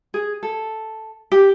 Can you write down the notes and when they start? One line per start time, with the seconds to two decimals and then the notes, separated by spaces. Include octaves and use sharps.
0.14 G#4
0.43 A4
1.32 G4